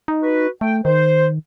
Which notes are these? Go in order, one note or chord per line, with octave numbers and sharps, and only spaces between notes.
D#4
F#4 B4
A3 G5
D#3 C5